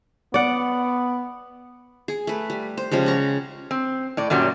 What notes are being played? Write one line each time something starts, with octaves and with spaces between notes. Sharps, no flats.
B3 D5 F#5
G#4
A3 B4
G3
C5
C#3 F3 G3 G#3
F#5 A#5 C#6
C4
A2 D5
F#2 A#2 F#3 G3